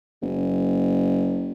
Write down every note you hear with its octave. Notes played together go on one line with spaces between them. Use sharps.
F#1